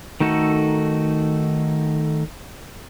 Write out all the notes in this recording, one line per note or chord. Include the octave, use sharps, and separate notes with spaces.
D#3 A3 D#4 F#4 A4